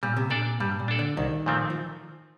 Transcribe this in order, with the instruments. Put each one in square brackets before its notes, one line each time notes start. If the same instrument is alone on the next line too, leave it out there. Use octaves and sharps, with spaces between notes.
[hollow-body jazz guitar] A#2 [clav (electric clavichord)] G3
[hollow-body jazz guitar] C3
[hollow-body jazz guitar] A#2 [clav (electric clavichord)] D4 A4 D5
[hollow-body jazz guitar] G2 [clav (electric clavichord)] G3
[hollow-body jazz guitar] A#2
[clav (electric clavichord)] D4 A4 D5
[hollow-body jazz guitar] D3
[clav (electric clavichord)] C2 [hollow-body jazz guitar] D#3
[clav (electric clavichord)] A#2 F3 A3 C4
[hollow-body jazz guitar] F3